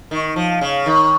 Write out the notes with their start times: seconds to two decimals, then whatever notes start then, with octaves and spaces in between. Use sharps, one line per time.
0.11 D#3
0.36 F3
0.61 C#3
0.86 D#3